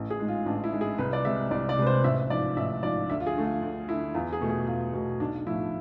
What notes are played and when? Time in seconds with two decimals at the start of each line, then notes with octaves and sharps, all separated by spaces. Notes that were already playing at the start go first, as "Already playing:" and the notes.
Already playing: A1
0.10 G#4
0.19 G#2 G#3
0.28 F4
0.46 A1 D4
0.64 E4
0.72 G#2 G#3
0.81 G#4
0.98 C2 B4
1.13 D5
1.25 C3 G#3 E5
1.51 C2 D5
1.69 D5
1.78 C3 G#3 B4
1.87 C5
2.04 A1 E5
2.30 G#2 F3 D5
2.57 A1 E5
2.83 G#2 F3 D5
3.09 D2 E5
3.20 F4
3.27 G#4
3.36 D3 A3
3.44 F4
3.62 D2
3.88 A3 E4
3.92 D3
4.14 E2 F4
4.33 G#4
4.41 B2 A3
4.50 G#4
4.67 E2 F4
4.94 B2 A3
5.20 B1 D4
5.47 A2 F3 E4